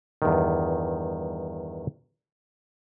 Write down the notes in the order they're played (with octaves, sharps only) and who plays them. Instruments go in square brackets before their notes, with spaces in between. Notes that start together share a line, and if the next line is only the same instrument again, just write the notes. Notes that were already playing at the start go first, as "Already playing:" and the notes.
[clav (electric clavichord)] E2 G2 D#3